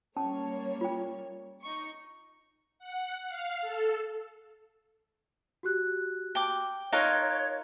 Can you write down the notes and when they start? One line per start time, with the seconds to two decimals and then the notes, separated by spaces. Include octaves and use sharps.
0.16 G3 A#3 C#4 C#5 A5
0.81 F4 G5
1.62 D#4 C#6
2.79 F#5
3.28 F5
3.61 A4
5.63 F#4 G4 F#6
6.35 G5 D6
6.92 D#4 F4 A#4 C#5 C#6 F#6 D7